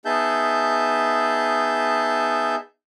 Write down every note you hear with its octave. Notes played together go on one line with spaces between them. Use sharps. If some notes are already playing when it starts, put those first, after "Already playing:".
B3 D#4 G#4 E5 A5 G6